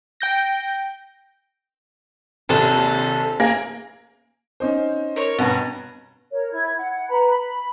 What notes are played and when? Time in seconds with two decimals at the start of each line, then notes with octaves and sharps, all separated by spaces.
0.20 G5 G6 A#6
2.49 A#1 D#2 C3 A4
3.40 A#3 G#4 A#4
4.60 C#4 D#4 C5
5.16 A#4 C#5
5.39 G2 B2 A#5
6.31 A#4 C#5
6.51 E4 G#6
6.78 F#5
7.08 B4 A#5 B5
7.29 B5